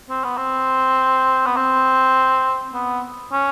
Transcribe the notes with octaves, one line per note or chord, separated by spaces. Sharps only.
C4
B3
C4
B3
C4
B3
C#4